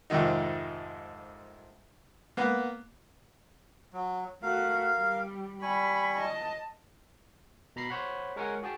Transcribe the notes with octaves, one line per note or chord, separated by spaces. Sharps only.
F2 G#2 C3 D#3 D#4
A#3 B3
F#3
A3 F#4 A#4 F5
G3
G3 G#5 B5 C#6
D#5 A5
B2 A#5 B5 C7
C5 C#5 F#5 B5
G#3 A#4 C#5 F#5 G#5
F#4 G#4 G5 A5